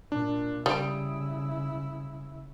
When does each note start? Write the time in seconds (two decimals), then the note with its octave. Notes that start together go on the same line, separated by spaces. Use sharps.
0.12 A#2 D4
0.66 C#3 G3 E4 D#6 D7